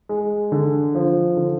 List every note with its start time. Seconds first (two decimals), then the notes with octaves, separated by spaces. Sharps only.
0.09 G#3
0.52 D3
0.95 F3
1.37 D3